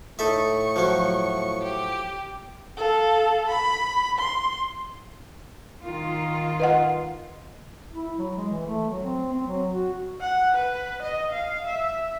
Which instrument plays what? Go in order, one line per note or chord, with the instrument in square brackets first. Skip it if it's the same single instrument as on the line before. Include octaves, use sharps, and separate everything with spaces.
[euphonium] A2 [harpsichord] D#4 A4 E5 [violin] C#6
[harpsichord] F3 F#3
[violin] G4
[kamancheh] A4 F5
B5
C6
[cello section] D#3 F4
[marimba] B4 D#5 F#5
[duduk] E4
F#3
G#3
E3
A3
F#3
C4
C4
F#3
F#4
[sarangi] F#5
B4
D#5
F5
E5